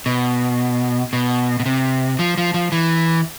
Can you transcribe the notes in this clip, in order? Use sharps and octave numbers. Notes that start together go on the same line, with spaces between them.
B2
B2
B2
C3
F3
F3
F3
E3